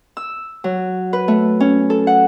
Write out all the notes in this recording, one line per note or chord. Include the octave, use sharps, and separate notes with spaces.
E6
F#3
B4
A3
C#4
A4
F#5